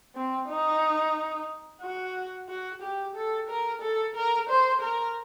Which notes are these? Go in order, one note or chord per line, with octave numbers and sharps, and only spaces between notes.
C4
D#4
F#4
F#4
G4
A4
A#4
A4
A#4
C5
A#4